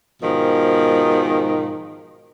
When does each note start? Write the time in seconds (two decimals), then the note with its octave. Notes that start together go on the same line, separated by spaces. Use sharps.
0.23 G#2 B2 D#3 F3